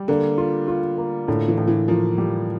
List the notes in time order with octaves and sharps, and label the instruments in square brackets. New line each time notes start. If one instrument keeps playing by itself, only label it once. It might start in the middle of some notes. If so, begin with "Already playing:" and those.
Already playing: [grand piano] G3
[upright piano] D3 [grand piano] A#3
[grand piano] F4
F4
A#3
[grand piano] A2 [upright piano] D3
[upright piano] E3
[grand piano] A2
[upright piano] E3
[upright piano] F3 [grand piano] A#3
[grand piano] G3